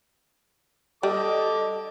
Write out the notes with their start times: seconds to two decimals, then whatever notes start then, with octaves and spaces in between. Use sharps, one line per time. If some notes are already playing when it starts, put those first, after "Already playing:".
1.03 G3 A4 D#5 D6